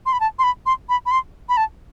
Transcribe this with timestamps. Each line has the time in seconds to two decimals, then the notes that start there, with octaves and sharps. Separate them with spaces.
0.06 C6
0.13 B5
0.20 A5
0.39 C6
0.43 B5
0.66 C6
0.89 B5
1.06 B5
1.11 C6
1.49 B5
1.57 A5